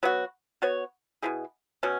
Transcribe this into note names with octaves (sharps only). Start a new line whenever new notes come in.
F#3 B3 F#4
B3 F#4 C#5
B2 A#3 E4 G#4
B2 F#3 C#4